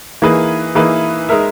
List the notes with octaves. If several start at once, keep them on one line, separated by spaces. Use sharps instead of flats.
E3 A#3 D#4 G#4 B4
E3 A#3 D#4 G#4 B4
G#3 D#4 A#4 E5